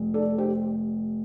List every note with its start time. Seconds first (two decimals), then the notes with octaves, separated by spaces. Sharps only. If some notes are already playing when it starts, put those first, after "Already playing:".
Already playing: F1
0.14 A4 D5
0.38 G4 C5